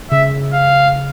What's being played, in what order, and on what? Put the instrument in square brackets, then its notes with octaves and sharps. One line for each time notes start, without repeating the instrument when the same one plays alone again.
[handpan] C#3 [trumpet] E5
[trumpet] F5